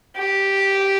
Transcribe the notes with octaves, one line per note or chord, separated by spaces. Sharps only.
G4